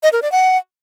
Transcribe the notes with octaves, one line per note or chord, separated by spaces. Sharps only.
D#5
A#4
D5
F#5